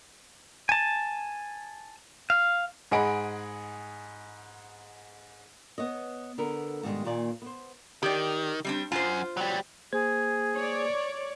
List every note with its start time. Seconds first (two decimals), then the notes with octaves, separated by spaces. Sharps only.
0.69 G#5 A5
2.30 F5
2.91 G#2 G#4 D#5 F#5 B5 D7
5.78 B3 C#5 D#5
6.38 D3 B3 A#4
6.83 G#2 B2 D#3 E3 G3 G#3
7.05 A#2 D#3 A#3 D#4 D5 G#5
7.42 B3 C5
8.03 D#3 G4 D5
8.65 G3 C4 D4
8.92 F#2 F4 C5
9.37 F#3 G3
9.93 A#3 G#4 C5 G#6
10.56 C#5 D5